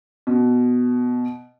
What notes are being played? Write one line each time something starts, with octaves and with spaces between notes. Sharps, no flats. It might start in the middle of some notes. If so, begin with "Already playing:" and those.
B2